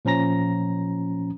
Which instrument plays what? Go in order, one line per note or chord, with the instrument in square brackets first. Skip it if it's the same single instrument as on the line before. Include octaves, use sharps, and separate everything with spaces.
[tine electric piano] A#2 F3 C#4 A#5 A#6